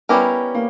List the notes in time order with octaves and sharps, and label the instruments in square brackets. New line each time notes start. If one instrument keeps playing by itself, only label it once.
[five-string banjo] G3 C#4 E4 G4 A#4 [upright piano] B3
[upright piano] A#3